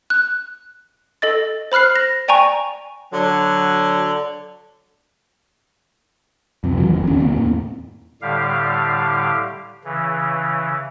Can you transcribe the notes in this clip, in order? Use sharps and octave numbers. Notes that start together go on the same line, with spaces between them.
F#6
A4 D#5 A6
C5 B5 F6 F#6 C7
A#6
D5 G5 G#5 A#5 C#6
D3 F#3
F2 C3
E2 D#3 E3 F#3
F#1 E2
D1 F#2 D#3 C#4
D#2 D3 A#3 C4
E2 A2
A2 D3 G3 G4 F5
C#3 E3